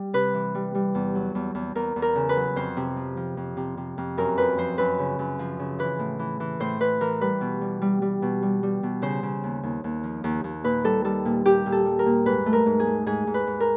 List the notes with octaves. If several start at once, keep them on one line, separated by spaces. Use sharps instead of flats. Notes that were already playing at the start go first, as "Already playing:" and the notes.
Already playing: G3
C3 B4
E3
G3
G3
E2
F#3
E2
E2
E2 A#4
E2
A#4
C#3
B4
F#3
F2 C5
C3
F3
F3
F2
C3
C3
F2
F#2 A#4
F3 B4
F3 C5
F#2 B4
C#3
F#2
F3
C#3
E3 B4
A2
E3
E3
A2 C5
E3 B4
E3 A#4
G3 B4
B2
G3
G3
G3
B2
G3
G3
B2
C#3 C5
C#3
D#2
D#2
D#2
F3
D#2
D#2
A#2 B4
G3 A4
G3 A4
A#2
A#2 G4
A#2
A4
G3
A#4
A#2
G#2 B4
A3
A#4
G#2
G#4
A3
G#2 G#4
G#2
B4
G#2
A#4